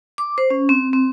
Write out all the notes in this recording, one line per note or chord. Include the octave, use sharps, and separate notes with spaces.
D6
C5
C#4
C4
C4